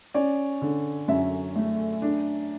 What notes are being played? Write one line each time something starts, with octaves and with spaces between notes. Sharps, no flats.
C#4 D5
D3
F#2 E5
A3
D4